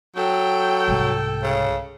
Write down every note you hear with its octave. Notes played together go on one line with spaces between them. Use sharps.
F#3 A4 G5
C2 G#2
C#3